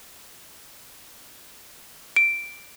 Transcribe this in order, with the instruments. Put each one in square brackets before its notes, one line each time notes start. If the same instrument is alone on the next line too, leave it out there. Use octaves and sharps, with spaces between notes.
[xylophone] D7